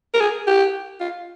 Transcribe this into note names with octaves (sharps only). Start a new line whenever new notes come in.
A#4
G#4
G4
F4